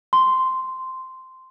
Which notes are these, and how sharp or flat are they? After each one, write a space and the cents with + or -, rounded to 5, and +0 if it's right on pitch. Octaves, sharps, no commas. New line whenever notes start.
C6 -10